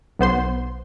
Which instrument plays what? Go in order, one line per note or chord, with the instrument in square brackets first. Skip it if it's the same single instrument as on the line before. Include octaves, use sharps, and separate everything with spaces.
[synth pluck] B1 B3 C5 C6